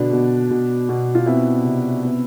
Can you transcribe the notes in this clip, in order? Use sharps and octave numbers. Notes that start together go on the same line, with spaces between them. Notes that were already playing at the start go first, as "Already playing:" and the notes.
Already playing: B2 D3 B3 D4
B2
B2
B2
F4
B3 C4 E4
C3
B3